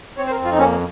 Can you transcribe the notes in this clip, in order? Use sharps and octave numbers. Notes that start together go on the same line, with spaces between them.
C4 C#5
C5
A#4
F2
F4
D#4
A#3 C#4